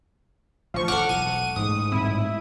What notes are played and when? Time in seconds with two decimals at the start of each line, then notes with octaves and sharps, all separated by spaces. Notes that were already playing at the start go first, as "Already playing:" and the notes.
0.74 A1 D3 F3 C#6
0.88 E1 F#2 A2 A4 F#5 C#6 D6 F6
1.09 E1 B1 D#7
1.56 A1 G#2 D#6
1.92 A2 G3 C4 E4